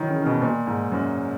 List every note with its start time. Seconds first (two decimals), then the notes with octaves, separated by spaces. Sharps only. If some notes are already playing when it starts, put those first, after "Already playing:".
Already playing: D#3 E3 F#3
0.10 C#3
0.22 C#3
0.26 B2
0.41 A#2
0.67 G#2
0.92 F#2